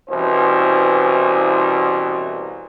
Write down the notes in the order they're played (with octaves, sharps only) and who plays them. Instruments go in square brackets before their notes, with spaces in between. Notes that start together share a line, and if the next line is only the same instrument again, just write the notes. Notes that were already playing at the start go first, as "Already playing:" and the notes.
[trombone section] C2 B2 E3 C#4 C5